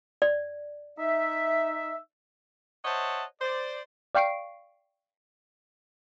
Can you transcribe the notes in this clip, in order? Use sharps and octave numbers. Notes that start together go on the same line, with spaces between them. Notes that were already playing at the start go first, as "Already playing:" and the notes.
D5
D#4 E5
C5 C#5 D#5 E5 F#5 A5
C5 D5
D5 F5 G5 C#6 C7 D7